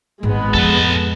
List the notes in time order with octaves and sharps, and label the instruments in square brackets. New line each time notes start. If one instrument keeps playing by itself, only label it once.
[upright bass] G#1 [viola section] G#3 B3
[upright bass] F2 [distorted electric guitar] A4 B4